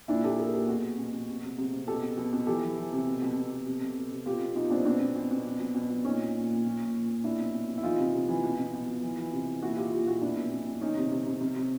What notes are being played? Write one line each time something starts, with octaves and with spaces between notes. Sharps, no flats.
A#2 D4 E4
A#2 G4 A4
A#2 G#4 A#4
A#2 G4 A4
B2 F#4 G#4
B2
B2
B2
C3
C3
C3
C3
B2 G4 A4
B2
B2
B2
E3 G4 A4
E3
E3
C3
B2
B2
B2
B2
C3
C3
C3
C3
B2 F4 G4
B2
B2 D#4 F4
B2 C4 D4
B2 C4 D4
B2
B2
B2
B2
B2
B2
B2
A#2 C#4 D#4
A#2
A#2
A#2
A#2
A#2
A#2
A#2
B2 D4 E4
B2
B2
B2
E4
E3 D#4 F4
C3
C3
E3
B2
B2
B2
B2
E3
E3
C3
E3
A#2 E4 F#4
A#2 F4 G4
A#2 F4 G4
A#2 E4 F#4
B2 D4 E4
B2
B2
B2
D#3 C#4 D#4
C3
C3
C3
C3
C3